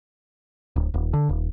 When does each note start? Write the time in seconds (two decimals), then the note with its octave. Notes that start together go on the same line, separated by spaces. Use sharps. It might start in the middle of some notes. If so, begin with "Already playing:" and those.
0.76 D1
0.94 D#1
1.13 D3
1.29 D#1